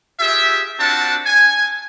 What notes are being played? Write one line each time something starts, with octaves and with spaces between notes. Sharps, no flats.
F4 G4 G#4 E5
C4 D4 F4 F#4 F#5 A5
G#5